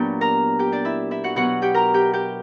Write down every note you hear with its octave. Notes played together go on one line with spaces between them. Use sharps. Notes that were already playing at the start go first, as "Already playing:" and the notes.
Already playing: A#2 F#3 B3 D4 G4 G5
A#4 A#5
G4 G5
D4 D5
E4 E5
E4 E5
F#4 F#5
B2 F#3 B3 F#4 F#5
G4 G5
A#4 A#5
G4 G5
G4 G5